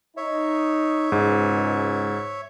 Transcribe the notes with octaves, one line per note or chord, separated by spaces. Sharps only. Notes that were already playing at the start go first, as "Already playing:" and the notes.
D#4 C#5 E5
C#2 G#2 B2 G#3